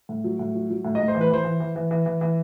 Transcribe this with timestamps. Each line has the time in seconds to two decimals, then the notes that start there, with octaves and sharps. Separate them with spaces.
0.09 A2
0.24 F#3
0.39 A2
0.55 F#3
0.70 F#3
0.85 A2
0.95 A2 D#5
1.08 C5
1.15 E3
1.21 B4
1.30 E3 C5
1.45 E3
1.60 E3
1.76 E3
1.91 E3
2.06 E3
2.21 E3